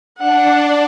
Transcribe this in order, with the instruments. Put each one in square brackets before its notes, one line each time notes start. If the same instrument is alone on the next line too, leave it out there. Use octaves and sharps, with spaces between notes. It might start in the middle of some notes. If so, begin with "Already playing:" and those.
[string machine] D4 [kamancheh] F#5